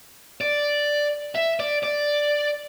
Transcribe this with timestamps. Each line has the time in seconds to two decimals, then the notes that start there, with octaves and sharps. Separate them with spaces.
0.41 D5
1.36 E5
1.60 D5
1.83 D5